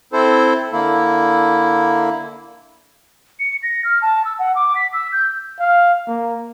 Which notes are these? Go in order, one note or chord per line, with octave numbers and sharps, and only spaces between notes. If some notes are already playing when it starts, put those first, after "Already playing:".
C4 E4 A4 C5
D3 A#3 E4
C#7
A#6
F6
A5
E6
F#5
D6
B6
E6
G6
F5
A#3